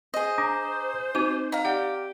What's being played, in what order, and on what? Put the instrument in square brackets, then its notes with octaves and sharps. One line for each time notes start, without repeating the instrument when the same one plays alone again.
[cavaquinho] G#4 D#5 [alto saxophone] C5
[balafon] D4 [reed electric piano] A#5 D6 D#6
[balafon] C4 F#4 D6 [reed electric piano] D#4
[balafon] D#5 [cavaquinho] F5 A#5
[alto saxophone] G4 [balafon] D5 F#5